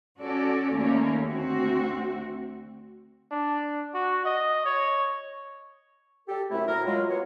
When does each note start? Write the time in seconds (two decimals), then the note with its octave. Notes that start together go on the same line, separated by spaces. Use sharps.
0.21 C#4 F#4 A4 D5
0.76 D#2 A3 A#3 C#4
1.29 D2 C4 F#4
3.31 D4
3.94 F#4
4.25 D#5
4.65 C#5
6.28 G4 A4
6.51 F#2 C3 A3 E4
6.68 D2 A2 A#4
6.86 F#3 G#3 F4
7.09 B3 F#4 C#5